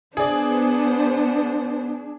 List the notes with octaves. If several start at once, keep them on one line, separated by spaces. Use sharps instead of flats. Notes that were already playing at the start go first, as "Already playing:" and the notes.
B3 D4 G#4 C5 D5